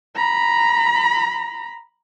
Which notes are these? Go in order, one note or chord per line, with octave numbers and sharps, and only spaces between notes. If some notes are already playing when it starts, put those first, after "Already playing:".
A#5 B5